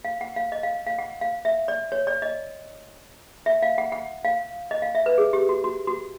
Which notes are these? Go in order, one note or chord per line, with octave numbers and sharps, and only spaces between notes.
F5
F#5
F5
D#5
F5
F5
F#5
F5
E5
D5
C#5
D5
D#5
E5
F5
F#5
F#5
F5
D#5
F5
E5
B4
G#4
G4
F#4
F#4
F#4